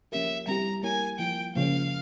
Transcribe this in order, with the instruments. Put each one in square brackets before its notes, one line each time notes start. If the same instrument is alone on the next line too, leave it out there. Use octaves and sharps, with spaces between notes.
[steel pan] F3 A#3 C#4 G4 A#4 [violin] E5
[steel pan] G3 C4 E4 G4 [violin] A#5
[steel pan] A#3 E4 A#4 C#5 [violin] G#5
[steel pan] F3 A#3 E4 [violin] G5
[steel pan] C#3 F3 A#3 [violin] F5